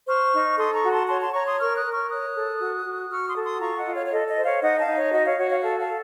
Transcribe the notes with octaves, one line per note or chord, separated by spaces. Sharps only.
C5 C#6 F6
D#4
A4 C6 D#6
A#5 C#6
F#4
A5 C6
C#5 A5 C6
A5 C6
C#5 A#5 C#6
C6 D#6
A#4 C#6 F6
D#6 F#6
A#4
C#6 F6
C#5 D#6 F#6
A4
F#4
F#4
F#4 C#6 F6
C6 D#6
A4
C6 D#6
F4 A#5 C#6
D#5 F#5
F4
C#5 F5
C#5
A4 D#5
D#5
C5
C#5 F5
D#4 D#5 F#5
F5 A5
D#4
C#5
F#4 D#5
C#5 F5
F#4 C#5
C#5 F5
A4 F5 A5
F5 A5
A4